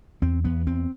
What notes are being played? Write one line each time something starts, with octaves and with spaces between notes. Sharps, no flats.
E2 C4
E2 B3
E2 C4